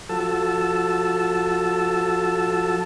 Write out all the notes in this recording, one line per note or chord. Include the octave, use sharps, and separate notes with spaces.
F3 F#4 A4 A5 E6